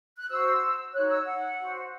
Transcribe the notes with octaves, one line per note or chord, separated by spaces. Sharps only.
F#6
F#4 C5 E6
D#4 F#4 C#5 F#6
E6
F#5
F#4 C5